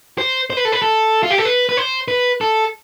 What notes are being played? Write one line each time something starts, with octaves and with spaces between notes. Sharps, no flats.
C5
C5
B4
A4
B4
A4
F4
G4
A4
B4
B4
C5
B4
A4